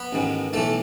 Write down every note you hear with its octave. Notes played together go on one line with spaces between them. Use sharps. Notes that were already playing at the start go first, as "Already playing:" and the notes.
Already playing: B3 B4
A1 G#2 D#3
B1 A2 E3 A3 A4